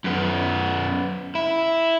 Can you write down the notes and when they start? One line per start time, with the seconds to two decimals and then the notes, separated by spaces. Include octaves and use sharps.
0.04 F#2 B3
1.35 E4